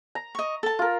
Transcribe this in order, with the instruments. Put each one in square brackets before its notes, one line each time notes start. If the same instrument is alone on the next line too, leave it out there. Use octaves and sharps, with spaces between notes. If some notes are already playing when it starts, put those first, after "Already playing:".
[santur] A#5
[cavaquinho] D#5 C#6
A4 A5
[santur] F4 A#4